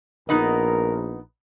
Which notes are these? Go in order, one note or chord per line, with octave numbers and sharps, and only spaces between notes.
A#1 B3 D#4 A#4 D#5